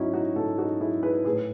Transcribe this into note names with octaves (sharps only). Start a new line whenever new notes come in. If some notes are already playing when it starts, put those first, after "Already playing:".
Already playing: G#2 F#3 C#4 D#4 E4 F#4
D#4 F#4
G#2 F#4 A4
D#4 F#4
F#3 E4 G#4
G#4 B4
A2 G#4 B4